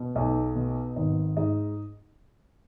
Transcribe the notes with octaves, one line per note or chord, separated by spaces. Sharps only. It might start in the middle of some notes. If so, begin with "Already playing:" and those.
Already playing: B2
B1 D#4 D#5
B2
G#1 D#4 D#5
G#2 D#4 D#5